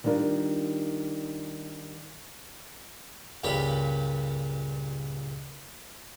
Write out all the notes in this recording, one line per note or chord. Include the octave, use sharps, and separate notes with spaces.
D#3 G3 D4 F4 A#4
C#2 G2 A#2 G4 C#5 B5